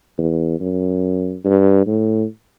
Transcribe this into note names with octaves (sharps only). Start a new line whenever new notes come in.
E2
F#2
G2
A2